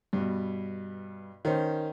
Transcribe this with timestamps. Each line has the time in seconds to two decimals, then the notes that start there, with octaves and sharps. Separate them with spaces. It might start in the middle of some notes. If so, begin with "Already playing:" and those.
0.13 G2 B2
1.45 D#3 C#4 C5